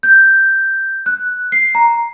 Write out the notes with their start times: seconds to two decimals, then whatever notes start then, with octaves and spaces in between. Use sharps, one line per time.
0.03 G6
1.06 F#6
1.52 C7
1.75 A#5